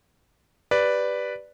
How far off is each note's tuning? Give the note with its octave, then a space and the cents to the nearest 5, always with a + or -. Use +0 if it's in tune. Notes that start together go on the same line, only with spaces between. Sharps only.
G4 +0 B4 +0 D5 +0